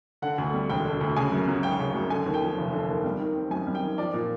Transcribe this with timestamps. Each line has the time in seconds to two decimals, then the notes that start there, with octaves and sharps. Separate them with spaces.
0.22 D3 F#5
0.38 D2
0.54 G3
0.69 E1 G5
0.85 D3
1.01 D2
1.16 C#3 G#5
1.32 F#2
1.47 F#3
1.63 G#1 G5
1.79 C#3
1.95 F#2
2.10 D3 G#5
2.26 D#2
2.34 G5
2.42 F3
2.57 F1
2.73 D3
2.89 D#2
3.04 G3
3.20 D#3
3.35 C4
3.51 F#2 G#5
3.67 G3
3.75 G5
3.83 D#3
3.98 F3 D5
4.14 A#2